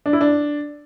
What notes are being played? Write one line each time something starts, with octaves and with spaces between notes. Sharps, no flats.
D4
E4
D4